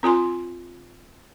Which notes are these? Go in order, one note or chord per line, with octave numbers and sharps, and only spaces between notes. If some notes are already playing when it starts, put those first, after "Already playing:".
C4 F4 G#5 C6